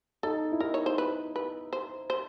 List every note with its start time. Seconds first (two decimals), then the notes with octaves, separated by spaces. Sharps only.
0.23 D#4 A4
0.52 E4
0.60 D#4 A#4
0.74 C#5
0.86 C5
0.98 B4
1.36 B4
1.73 C5
2.10 C5